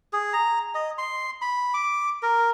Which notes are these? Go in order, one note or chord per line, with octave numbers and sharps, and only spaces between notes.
G#4
A#5
D#5
C6
B5
D6
A#4